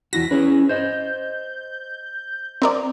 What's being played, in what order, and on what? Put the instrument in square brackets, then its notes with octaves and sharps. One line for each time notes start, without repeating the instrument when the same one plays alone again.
[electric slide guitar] E2 E4 F#4 [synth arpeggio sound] A#6 [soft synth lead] B6
[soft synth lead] C#4 [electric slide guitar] E4 G#4 B4
[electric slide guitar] C5 D#5 [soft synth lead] G6
[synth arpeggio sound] C4 A#4 D5